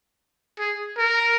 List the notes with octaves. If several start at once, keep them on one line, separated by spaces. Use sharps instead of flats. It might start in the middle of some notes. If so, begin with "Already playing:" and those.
G#4
A#4